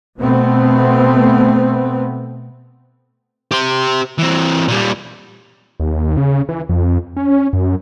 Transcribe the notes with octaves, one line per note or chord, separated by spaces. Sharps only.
B2 A3 B3 C4
G4 C5
E3 C4
A#2 G3
D#2
C#3
E3
F2
C#4
F#2